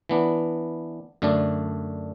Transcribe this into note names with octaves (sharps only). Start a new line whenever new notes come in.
E3 B3 D4
F#2 D3 A3 D4